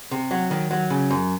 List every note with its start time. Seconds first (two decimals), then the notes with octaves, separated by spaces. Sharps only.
0.11 C3
0.31 F#3
0.51 D#3
0.71 F#3
0.90 C#3
1.11 F#2